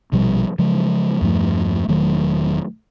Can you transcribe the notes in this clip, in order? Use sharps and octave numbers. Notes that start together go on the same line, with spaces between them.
A#1 B2 F3 G3
C#3 F3 F#3 G#3
E2 G2 F3 A3
E1 D#3 F#3 A3